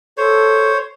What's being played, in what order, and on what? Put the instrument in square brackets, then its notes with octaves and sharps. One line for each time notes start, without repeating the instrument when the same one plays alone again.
[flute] A4 [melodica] C5 C#5